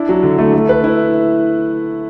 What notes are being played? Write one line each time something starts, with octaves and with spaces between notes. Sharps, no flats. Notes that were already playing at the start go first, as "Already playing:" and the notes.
Already playing: D4 E4
F#3
D3
A3
A3
B4
E4